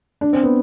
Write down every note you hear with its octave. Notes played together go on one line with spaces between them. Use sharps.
D4
C4
B3